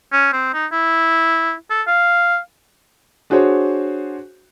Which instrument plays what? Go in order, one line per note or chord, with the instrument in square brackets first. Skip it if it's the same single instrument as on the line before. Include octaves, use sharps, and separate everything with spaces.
[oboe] C#4
C4
D#4
E4
A4
F5
[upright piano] D4 F#4 G#4 C5 C#5